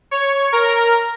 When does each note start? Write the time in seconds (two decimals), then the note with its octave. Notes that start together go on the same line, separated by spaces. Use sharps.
0.11 C#5
0.53 A#4